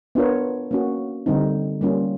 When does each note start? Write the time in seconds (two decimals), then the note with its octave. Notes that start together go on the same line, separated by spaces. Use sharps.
0.15 B3 D4 F4 A#4 C#5
0.71 A#3 C#4 F#4
1.26 D3 G3 C4 D#4
1.81 G3 A#3 C#4 F4